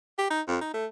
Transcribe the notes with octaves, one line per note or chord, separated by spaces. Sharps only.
G4
D#4
F2
D#4
A3